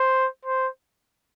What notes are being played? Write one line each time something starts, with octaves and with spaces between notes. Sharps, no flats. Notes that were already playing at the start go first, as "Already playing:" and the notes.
Already playing: C5
C5